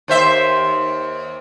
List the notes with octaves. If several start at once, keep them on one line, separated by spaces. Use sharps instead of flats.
D#2 C5 E5